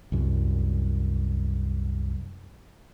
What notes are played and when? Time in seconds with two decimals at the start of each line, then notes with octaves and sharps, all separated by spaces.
0.12 C2 F#2